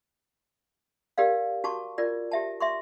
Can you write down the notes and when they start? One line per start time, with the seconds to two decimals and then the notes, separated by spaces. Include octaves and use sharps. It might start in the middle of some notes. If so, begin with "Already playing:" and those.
1.18 G4 A#4 D5 F5
1.64 F#4 A5 C#6 D6
1.98 F4 A#4 D5
2.31 G4 E5 A5
2.60 E5 C6 C#6